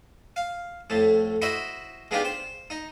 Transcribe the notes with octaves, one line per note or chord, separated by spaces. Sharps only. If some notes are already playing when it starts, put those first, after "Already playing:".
F5
F2 A2 A3
E4 F#4 C5 D#5 E5 B5
G#3 B3 D4 D#4 F4 G4
C5
D#4